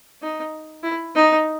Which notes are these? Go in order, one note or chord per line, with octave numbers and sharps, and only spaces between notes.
D#4
E4
D#4